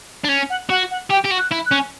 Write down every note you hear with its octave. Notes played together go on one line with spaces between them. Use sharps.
D4
C#4
F#5
F#4 F#5
F#5
G4 G5
G4
F#4
F#6
E4
F#6
C#4